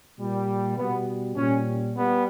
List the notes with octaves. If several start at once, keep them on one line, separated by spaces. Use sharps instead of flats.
A#2 G3
B2 G3 B3
A#2 G3 C#4
G3 B3